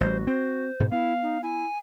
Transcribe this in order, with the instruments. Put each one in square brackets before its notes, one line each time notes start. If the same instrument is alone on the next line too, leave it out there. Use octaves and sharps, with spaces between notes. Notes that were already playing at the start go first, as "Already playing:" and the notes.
[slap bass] A1 G3 [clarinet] F#4 [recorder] C5
[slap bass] C4 [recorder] C5
[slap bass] G#2 B2
[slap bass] B3 [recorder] E4 [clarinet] F5
[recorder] D#4
[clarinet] E4 [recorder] G#5